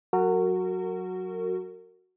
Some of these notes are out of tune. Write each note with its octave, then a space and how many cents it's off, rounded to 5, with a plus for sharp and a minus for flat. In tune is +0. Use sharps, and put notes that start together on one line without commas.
F#3 -10 F#4 +0 A#4 -35